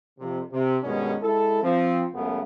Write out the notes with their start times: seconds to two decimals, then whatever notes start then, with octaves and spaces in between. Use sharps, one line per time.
0.19 F2 C3
0.52 C3
0.83 G2 B2 D#3 G#3 C#4
1.22 G#3 E4 A4
1.62 F3 C4
2.13 C#2 F#2 C#3 A3 B3